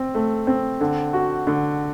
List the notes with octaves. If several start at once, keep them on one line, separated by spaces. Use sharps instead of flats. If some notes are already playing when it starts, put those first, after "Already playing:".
Already playing: C4
A3
C4
D3
F#4
D3